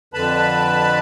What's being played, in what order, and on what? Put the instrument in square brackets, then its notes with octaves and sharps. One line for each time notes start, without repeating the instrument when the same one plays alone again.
[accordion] F2 D3 B4 A5 B5